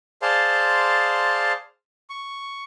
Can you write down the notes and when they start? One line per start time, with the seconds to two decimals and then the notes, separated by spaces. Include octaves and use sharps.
0.22 G#4 C5 D5 F5 A5 C6
2.10 C#6